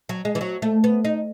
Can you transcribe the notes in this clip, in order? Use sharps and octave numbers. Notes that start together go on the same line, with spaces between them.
F#3
G#3
E3
F#3
A3
B3
D#4